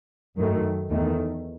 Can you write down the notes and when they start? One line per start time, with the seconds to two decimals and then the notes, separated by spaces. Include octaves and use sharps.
0.36 F#2 D#3 A3
0.90 E2 D#3 A3